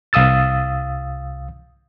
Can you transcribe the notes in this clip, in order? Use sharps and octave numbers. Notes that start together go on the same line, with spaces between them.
C2 F5 D#6 E6 A6